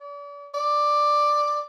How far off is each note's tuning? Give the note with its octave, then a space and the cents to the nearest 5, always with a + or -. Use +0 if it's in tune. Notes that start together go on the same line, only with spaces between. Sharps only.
D5 -40
D5 +10